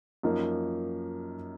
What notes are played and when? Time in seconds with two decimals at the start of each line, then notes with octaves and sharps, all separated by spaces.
0.23 F#2 F3 A#3 D#4